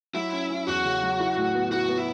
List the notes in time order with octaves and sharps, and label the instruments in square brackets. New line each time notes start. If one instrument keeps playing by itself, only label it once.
[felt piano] F#3 [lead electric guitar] E4
[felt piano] C#4
C#4
[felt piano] E2 [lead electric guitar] F#4
[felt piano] C#3
F#3
E4
A2
B3
[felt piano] E4 [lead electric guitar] F#4
[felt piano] B3
[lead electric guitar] E4